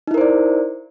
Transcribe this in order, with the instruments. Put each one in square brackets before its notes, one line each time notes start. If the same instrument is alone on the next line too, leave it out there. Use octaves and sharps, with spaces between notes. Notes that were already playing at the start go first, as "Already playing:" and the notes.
[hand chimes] D#4
E4
A#4
C5
D5